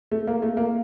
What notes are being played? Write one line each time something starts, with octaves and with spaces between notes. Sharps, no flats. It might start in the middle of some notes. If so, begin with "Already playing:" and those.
A3
A#3
A3
A#3